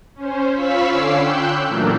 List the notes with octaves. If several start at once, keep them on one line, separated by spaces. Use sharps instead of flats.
C#4 C5
F4 F5 B5 C#6 E6 B6
D3 C#4 C#5 D6 E6 C7
G5 E6 F#6 G6
A#2 E3 F#3 A3 D4 A#4